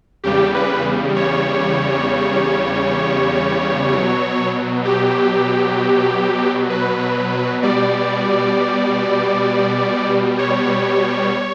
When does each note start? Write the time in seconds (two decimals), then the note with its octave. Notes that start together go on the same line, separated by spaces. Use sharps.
0.24 E2 C#3 G3 G4
0.54 B4
1.16 C#5
3.93 B2 F#3
4.85 G4
6.70 B4
7.62 B2 G3 D5
10.39 C#5